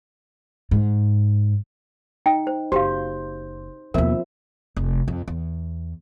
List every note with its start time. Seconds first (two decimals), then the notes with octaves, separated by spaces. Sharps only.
0.71 G#2
2.26 D#4 G5
2.47 C5
2.72 F#1 F#4 G4 C5 F5
3.94 D#2 B2 F3 C4 A#4 E5
4.77 F1
5.08 F2
5.28 E2